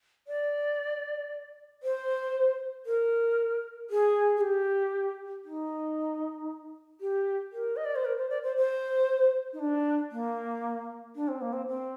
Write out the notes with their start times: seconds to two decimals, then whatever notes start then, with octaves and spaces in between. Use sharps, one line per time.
0.27 D5
1.83 C5
2.86 A#4
3.90 G#4
4.37 G#4
4.41 G4
5.45 D#4
7.01 G4
7.52 A#4
7.77 D#5
7.85 D5
7.96 C5
8.05 A#4
8.18 C5
8.30 D5
8.43 C5
8.57 C5
9.53 D#4
9.59 D4
10.12 A#3
11.16 D4
11.28 C4
11.41 A#3
11.53 C4
11.68 C4